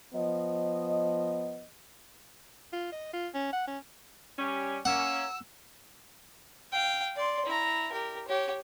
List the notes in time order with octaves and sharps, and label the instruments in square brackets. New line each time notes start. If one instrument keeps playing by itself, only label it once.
[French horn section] F3 B3 D#5
[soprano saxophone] F4
D#5
F4
C#4
F#5
C#4
[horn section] G3 C#4 G4
[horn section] A#3 C#4 [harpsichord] F#5 [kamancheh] E6
[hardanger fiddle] F5 G5
D5 C6
E4 A#5
G4 A#4
G4 C#5